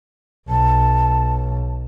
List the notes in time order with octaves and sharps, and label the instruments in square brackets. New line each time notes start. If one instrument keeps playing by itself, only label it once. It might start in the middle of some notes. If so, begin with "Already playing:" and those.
[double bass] B1 [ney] A5